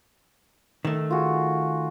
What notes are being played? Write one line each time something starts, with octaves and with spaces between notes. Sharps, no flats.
D#3 A3
F4 F#4 G#4